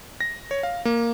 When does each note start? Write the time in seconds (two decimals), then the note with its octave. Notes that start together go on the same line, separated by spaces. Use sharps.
0.21 A#6
0.51 C#5
0.63 F5
0.85 A#3